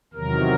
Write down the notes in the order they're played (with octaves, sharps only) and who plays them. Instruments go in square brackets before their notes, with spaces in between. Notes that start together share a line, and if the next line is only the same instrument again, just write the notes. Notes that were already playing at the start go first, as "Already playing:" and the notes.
[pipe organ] E2 C3 D#3 F#3 A#4